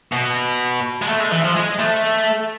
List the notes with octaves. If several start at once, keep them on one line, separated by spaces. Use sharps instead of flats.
B2
G#3
A3
G#3
E3
F3
G#3
A3